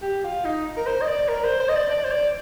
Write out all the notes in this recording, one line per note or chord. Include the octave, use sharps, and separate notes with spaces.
G4
F4
D#4
A#4
C5
D#5
D5
A#4
C5
C5
D#5
D5
D5
C5
D5